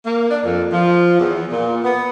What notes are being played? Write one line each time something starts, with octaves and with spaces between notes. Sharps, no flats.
A#3
D4
F2
F3
E2
A#2
B3